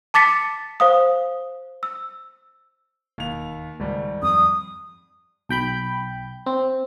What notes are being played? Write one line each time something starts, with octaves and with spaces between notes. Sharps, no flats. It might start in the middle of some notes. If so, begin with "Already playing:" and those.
A5 D6 A6 B6 C#7
C5 F5 D#6
E6
E1 D#2 F7
G#1 C#2 G3
F2 D#6
B1 G5 B5 G6
C4